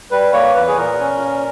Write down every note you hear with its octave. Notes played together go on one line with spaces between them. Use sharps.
G3 B4
A#3 C#5
E2 B4
G#4
A#2 A#4
C#4
A#2